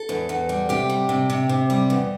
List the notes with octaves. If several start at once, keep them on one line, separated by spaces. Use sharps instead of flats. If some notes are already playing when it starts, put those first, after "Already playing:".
Already playing: A4
E2
E2
G3
C3 G4
G3
C3
C3
C3
G3
E2